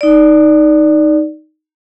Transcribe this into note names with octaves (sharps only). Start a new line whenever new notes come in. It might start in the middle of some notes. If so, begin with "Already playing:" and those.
D#4 D5